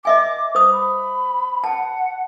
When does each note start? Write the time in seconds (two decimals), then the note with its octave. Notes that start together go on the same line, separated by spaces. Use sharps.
0.05 D#5 E5 G#5 D6
0.55 C5 D#6
0.72 B5
1.64 F#5 A5